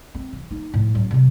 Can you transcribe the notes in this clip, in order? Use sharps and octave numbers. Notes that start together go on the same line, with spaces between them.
C4
E3
A#3 D#4
A2 F3
F#3 C#4
C3 F#3